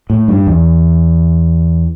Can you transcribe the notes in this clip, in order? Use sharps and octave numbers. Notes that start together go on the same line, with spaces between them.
A2
G2
E2